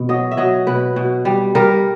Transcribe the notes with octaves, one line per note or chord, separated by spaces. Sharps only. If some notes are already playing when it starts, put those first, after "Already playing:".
Already playing: B2
F#3 D#5
E5
F#3 D#5
B2 B4
B2
G3
G3 A#4